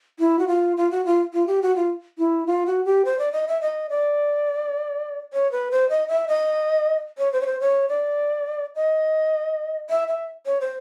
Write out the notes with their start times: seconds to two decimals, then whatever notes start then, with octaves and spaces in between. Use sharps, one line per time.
0.19 E4
0.39 F#4
0.48 F4
0.77 F4
0.91 F#4
1.06 F4
1.33 F4
1.47 G4
1.62 F#4
1.76 F4
2.18 E4
2.47 F4
2.66 F#4
2.85 G4
3.05 C5
3.19 D5
3.32 D#5
3.48 E5
3.61 D#5
3.90 D5
5.33 C#5
5.52 B4
5.71 C5
5.89 D#5
6.08 E5
6.28 D#5
7.18 C#5
7.33 C5
7.41 C#5
7.46 C5
7.60 C#5
7.89 D5
8.76 D#5
9.90 E5
10.08 E5
10.46 C#5
10.61 C5